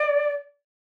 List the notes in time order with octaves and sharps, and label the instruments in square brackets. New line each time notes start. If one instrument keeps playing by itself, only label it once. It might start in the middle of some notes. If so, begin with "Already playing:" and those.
Already playing: [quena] D5